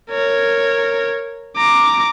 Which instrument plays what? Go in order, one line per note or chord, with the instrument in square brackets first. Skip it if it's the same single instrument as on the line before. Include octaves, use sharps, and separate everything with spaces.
[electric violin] A#4 C#5
A#5 D6